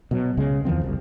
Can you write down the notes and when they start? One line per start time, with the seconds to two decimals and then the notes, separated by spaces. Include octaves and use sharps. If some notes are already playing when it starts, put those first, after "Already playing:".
0.11 B2 F#3
0.37 C#2 C#3 G#3
0.65 E2 D#3 F3 C4
0.84 F#1 C2